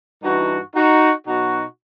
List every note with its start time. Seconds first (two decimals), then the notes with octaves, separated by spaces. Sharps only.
0.22 G2 E3 D#4 F#4
0.74 D#4 F#4
1.26 B2 F#3 D#4 F#4